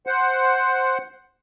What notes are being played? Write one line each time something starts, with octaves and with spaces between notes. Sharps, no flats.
C5 F#5